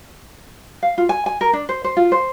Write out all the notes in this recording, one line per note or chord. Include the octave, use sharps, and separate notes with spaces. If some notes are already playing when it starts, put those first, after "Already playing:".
F5
F4
G#5
G#5
A#4
D4
C5
C5
F4
C5